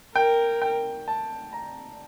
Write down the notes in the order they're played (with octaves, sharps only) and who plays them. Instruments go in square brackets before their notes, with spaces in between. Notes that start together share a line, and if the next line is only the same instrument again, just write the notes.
[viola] A#4 [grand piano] G5
[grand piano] G5
A5
A#5